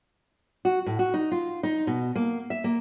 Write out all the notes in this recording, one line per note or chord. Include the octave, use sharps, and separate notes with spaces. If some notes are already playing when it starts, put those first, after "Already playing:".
F#4
A2
F#4
D#4
F4
D#4
B2
A#3
E5
A#3